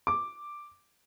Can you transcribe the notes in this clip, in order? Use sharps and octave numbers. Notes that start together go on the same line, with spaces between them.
D6